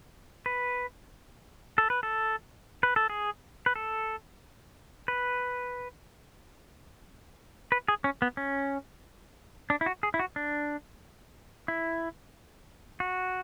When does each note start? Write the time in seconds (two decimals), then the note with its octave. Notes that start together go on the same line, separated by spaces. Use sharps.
0.46 B4
1.78 A4
1.90 B4
2.03 A4
2.83 B4
2.96 A4
3.10 G#4
3.66 B4
3.76 A4
5.08 B4
7.72 B4
7.88 G#4
8.04 C#4
8.22 B3
8.37 C#4
9.70 D4
9.81 E4
9.86 F#4
10.03 G#4
10.14 E4
10.19 F#4
10.36 D4
11.68 E4
13.00 F#4